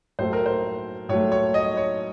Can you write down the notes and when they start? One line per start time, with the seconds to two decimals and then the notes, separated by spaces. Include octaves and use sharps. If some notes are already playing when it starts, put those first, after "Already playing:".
0.19 A2 F#3 A3 C5
0.33 A#4
0.46 C5
1.09 A2 F#3 A3 C#5
1.32 C#5
1.54 D#5
1.77 C#5